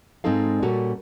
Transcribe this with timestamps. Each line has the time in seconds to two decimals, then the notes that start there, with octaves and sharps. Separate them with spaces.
0.24 G#2 G#3 C4 D#4 A4 F5
0.62 A#2 G3 C#4 F#4 A4